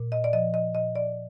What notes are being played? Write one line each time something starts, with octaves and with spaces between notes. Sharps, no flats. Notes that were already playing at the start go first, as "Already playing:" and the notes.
Already playing: A#2
D#5
D5
F3 D#5
D#5
A#2 D#5
D5